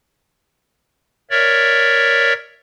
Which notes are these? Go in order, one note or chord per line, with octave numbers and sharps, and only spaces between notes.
A#4 C#5 D5 E5